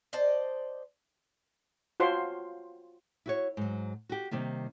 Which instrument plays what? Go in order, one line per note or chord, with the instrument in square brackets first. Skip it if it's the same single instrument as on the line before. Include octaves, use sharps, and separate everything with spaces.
[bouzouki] C5 D5 D#5 A5
[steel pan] F4 F#4 C5 C#5 A5 C6
[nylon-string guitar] E4 F#4 C#5
G#2 F#3
F#4 G4
C3 D#3 G3 A#3